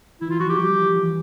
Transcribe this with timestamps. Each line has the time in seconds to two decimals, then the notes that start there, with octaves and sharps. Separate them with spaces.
0.21 E3 E4
0.30 F4
0.40 F3 F#4
0.50 G4
0.59 G3
0.78 F3
0.96 E3